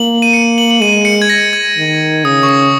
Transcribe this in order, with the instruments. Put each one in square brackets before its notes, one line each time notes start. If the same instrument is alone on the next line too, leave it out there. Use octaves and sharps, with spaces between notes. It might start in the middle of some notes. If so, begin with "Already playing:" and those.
Already playing: [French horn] A#3 [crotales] F#7
[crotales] D#7
C#7
F#7
F#7
[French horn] G#3 [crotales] D#7
[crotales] C#7
G#6
A#6
G#6
[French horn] D#3
[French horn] C#3 [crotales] D#6
[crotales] C#6
D#6